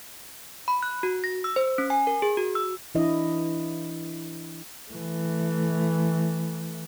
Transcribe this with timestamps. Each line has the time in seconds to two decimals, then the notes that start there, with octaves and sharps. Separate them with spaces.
0.68 B5
0.83 F#6
1.03 F#4
1.24 A#6
1.44 E6
1.56 C5
1.78 C#4
1.90 G#5
2.07 A#4
2.22 G#4
2.37 F#4
2.55 E6
2.95 E3 D4 E4 D#5
4.91 E3 A3